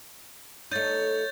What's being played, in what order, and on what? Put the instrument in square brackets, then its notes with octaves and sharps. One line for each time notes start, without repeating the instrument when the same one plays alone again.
[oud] A3 D#4 [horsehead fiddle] C#5 [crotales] G6 A6